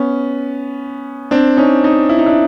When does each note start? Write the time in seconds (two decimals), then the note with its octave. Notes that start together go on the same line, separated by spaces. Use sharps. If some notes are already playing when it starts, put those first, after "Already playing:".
Already playing: B3 C#4
1.31 C4 D4
1.57 C#4 D#4
1.84 C#4 D#4
2.09 E4
2.19 D#4
2.26 D4 E4